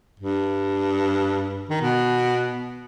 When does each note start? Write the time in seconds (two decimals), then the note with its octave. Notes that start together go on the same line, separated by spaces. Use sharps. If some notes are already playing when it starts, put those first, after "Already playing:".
0.20 G2
1.69 D#3
1.81 B2